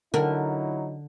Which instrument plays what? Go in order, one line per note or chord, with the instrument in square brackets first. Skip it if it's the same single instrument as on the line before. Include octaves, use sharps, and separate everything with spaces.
[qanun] D3 [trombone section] F#3 D#4 E4 [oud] A#4